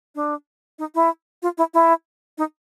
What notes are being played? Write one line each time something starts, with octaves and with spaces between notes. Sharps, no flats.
D4
D#4
E4
F4
E4
E4
D#4